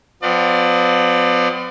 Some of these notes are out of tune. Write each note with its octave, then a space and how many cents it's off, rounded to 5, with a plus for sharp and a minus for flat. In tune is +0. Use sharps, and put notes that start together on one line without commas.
F3 +30 B3 +45 D5 +35